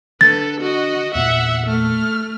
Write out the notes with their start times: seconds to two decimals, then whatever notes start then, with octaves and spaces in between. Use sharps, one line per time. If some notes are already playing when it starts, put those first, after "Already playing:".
0.21 D3 A4 B4 A6
0.61 F#4 D#5
1.15 E2 A#2 A#3 E5 F#5
1.66 A3 F6